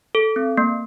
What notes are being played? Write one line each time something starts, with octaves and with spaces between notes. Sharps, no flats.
A4
C4
A#3